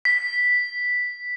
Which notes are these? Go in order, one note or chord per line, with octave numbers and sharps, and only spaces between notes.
B6